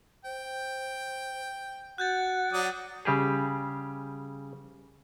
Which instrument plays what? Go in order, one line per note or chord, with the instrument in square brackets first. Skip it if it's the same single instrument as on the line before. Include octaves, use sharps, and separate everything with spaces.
[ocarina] C5 [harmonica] G5
[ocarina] F#4 [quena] F#5 [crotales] F#6 G6 A6
[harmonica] F#3 D5 D#6
[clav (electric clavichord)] C#3 G3 G4 G#4